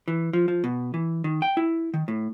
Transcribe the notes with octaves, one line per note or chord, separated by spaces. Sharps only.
E3
F3
F3
B2
E3
D#3
G5
E4
D#3
A2